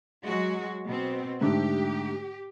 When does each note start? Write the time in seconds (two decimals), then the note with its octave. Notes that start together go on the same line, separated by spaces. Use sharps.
0.23 F#3 G#3 F#4
0.88 B2 C4
1.41 G#2 D3 A3 G4